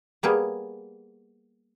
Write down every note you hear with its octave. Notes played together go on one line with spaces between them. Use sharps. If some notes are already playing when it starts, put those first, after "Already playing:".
G3 A#3 B3 G#4